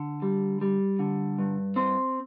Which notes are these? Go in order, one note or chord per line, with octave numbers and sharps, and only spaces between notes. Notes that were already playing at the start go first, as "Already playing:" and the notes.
Already playing: D3
G3
G3
D3
G2
C4